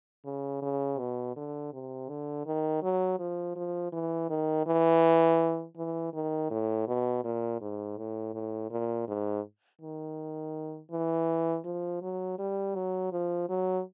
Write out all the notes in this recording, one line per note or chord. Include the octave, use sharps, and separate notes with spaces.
C#3
C#3
B2
D3
C3
D3
D#3
F#3
F3
F3
E3
D#3
E3
E3
D#3
A2
B2
A#2
G#2
A2
A2
A#2
G#2
D#3
E3
F3
F#3
G3
F#3
F3
F#3